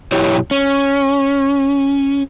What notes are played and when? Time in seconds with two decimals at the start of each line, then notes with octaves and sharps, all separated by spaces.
0.12 F#2 B2 E4 G4 C#5
0.51 C#4